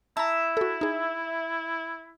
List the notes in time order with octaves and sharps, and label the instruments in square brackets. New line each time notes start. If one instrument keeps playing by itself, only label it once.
[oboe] E4 [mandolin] E5 [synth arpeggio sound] A5 A#5
[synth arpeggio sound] F#4 A4
D#4 G#4